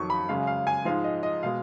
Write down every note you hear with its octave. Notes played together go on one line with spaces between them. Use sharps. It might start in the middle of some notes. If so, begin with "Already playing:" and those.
Already playing: F2 D#3 F#3 C#6
B5
F#2 C#3 G#3 F5
F5
G#5
G#2 F3 G#3 F5
D#5
D#5
B2 G#3 F5